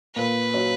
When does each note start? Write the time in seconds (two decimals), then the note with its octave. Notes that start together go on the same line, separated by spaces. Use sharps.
0.16 A#2 B4
0.54 F#3 C#4 F#4